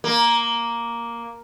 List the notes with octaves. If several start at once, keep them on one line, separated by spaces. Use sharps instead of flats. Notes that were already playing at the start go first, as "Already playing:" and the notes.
A#3